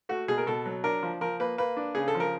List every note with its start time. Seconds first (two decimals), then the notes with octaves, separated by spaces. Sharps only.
0.09 A3 F#4
0.28 B2 G#4
0.38 A#4
0.47 B2 A4
0.66 F#3
0.84 D4 A#4
1.03 F3
1.21 F3 A#4
1.40 A#3 B4
1.58 A#3 B4
1.77 D4
1.95 C#3 G#4
2.08 A4
2.15 F3
2.20 A#4